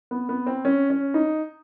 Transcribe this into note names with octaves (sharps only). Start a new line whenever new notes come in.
B3
B3
C4
C#4
C#4
D#4